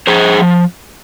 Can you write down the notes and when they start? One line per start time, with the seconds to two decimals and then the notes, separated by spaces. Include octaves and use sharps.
0.07 F3 G#4 C5
0.38 F3